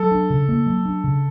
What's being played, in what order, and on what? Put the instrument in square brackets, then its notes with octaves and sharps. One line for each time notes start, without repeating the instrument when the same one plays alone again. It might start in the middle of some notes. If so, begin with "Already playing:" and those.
Already playing: [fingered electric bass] F#3 [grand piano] A4
[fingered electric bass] D4
C#3
A#3
F#3
D4
C#3